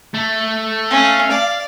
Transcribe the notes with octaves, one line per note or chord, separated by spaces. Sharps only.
A3
C#4 F5
D5